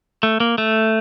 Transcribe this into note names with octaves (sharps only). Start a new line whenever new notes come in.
A3
A#3
A3